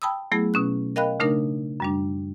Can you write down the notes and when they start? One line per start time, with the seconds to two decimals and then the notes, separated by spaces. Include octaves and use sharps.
0.02 G5 A5 B5 D#6 E6
0.32 F#3 A3 B3 E4 G#4
0.54 B2 C#4 F#6
0.96 A#4 D#5 F5 G5 B5 F#6
1.20 C#3 A3 D4 D#4 A#4
1.80 F#2 G3 D4